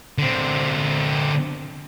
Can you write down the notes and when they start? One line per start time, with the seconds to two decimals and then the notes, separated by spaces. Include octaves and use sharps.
0.18 D3 C4